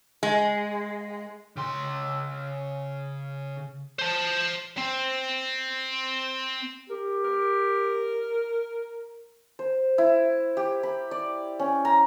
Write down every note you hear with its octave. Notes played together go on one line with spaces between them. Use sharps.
G#3
C#3 C6
C5 A5
C4
G4 A#4
A#4
C5
E4
G4
B5
D5
C#4
A#5